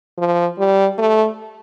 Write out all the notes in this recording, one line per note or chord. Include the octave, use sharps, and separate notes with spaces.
F3
G3
A3